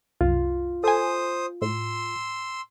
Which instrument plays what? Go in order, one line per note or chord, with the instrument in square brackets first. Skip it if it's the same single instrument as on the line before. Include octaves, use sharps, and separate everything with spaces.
[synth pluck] C2 F#2 [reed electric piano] F4
[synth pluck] A4 G#5 [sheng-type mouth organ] C5 D#6
[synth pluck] A2 [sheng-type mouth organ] C6 E6